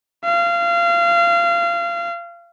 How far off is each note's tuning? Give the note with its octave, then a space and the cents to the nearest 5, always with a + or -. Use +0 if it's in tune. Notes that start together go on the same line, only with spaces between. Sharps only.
F5 -25